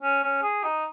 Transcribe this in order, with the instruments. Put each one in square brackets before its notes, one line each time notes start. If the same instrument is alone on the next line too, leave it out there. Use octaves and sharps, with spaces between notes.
[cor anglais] C#4
C#4
G#4
D#4